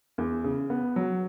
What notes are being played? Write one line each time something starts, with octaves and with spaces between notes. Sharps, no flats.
E2
C#3
B3
F#3